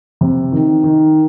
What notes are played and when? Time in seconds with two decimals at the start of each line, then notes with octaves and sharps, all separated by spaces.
0.21 C3
0.52 D#3
0.84 D#3